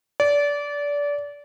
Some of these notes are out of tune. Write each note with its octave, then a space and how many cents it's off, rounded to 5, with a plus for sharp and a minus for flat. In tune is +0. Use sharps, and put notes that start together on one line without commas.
D5 -25